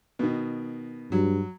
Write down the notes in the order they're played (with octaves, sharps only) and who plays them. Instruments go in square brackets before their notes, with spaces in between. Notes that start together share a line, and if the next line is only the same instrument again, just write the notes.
[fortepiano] B2 D#3
[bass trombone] G2 [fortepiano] F#3